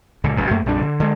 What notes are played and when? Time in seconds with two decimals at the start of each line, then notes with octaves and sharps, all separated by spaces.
0.24 C#2 A#2 D3
0.37 F1 C#2 A#2
0.51 F#2 A3 A#3
0.66 A#1 F2 G3 D4
0.82 D3
1.00 D3 G#3